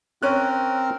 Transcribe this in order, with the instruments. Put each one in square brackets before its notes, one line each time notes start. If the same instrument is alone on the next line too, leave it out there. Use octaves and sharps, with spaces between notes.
[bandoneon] C4 A#4 [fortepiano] C#4 F#6